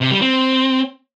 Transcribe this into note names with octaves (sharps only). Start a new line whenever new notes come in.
C3
G3
C4